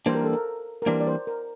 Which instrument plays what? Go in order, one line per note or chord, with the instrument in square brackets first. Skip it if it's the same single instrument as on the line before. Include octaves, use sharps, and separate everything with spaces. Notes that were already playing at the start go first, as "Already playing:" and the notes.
[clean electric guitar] E3 G3 A#3 D4 [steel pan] C5
[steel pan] A#4
A4
A#4
A#4
[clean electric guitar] E3 G3 A#3 D4 [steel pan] C5
[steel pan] D5
C5
A#4